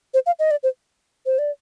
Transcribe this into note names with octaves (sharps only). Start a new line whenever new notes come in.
C5
F5
D#5
D5
C5
C5
D5